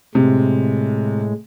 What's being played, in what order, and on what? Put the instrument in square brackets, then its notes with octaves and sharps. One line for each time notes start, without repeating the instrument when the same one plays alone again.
[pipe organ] A2 G#3 [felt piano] C3